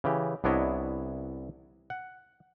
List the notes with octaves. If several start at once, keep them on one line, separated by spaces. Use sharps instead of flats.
C#3 E3 G4
C2 B3 D4 E4 C#5 D#5
F#5